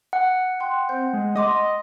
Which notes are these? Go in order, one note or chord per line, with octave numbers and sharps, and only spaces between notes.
F#5
G5 C6 F#6
C4 G6
G#3
D#5 C6 D6 D#6